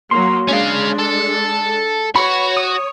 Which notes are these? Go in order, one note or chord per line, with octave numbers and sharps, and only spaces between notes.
F#3 A#3 C6
G#3 C#4 D4 F5
A4
F#4 B4 C#5 B5
D#6